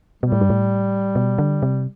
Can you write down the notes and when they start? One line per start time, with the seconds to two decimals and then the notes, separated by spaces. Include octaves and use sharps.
0.23 B2 G3
0.32 A2
0.41 G2
0.50 A2
1.16 B2
1.38 D3
1.62 C3